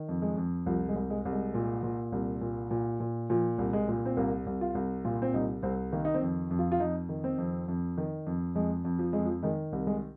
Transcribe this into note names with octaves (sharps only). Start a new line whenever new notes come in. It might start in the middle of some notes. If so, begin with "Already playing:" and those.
Already playing: D#3
F2
G#3
F2
C2 F3
G#3
C2
G#3
C2
G#3
A#2
A#2
C2
A#2
A#2
A#2
A#2 F3
C2
G#3
A#2
C4
C2 A#3
C2
F4
C2
A#2 F4
C4
C2 D#4
C2 C4
D#3 A#3
D#4
C4
F2
F2
F4
F4
F2 D#4
D#3
C4
F2
F2
D#3
F2
F2 G#3
F2
F3
F2 G#3
F3
D#3 G#3
C2
G#3